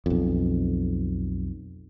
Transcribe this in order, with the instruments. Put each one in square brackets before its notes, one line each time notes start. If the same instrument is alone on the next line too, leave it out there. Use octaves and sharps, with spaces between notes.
[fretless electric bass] B1 F2